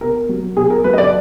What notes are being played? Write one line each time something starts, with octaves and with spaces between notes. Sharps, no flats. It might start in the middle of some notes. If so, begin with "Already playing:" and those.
B2 A#4
F#3
B2 G#4
A#4
F#3 B4
D#5
D5